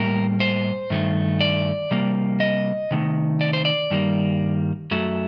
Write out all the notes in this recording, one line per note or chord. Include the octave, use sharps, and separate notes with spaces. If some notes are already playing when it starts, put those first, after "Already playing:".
Already playing: A2 G3 A#3 A#4
C5
G2 D#3 A3
D5
C3 G3 A#3
D#5
C3 D#3 A3
D5
C5
D5
G2 D#3 G3 A#3
F#2 F#3 A3